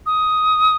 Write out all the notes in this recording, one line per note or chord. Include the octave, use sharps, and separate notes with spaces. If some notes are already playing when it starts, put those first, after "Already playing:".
D#6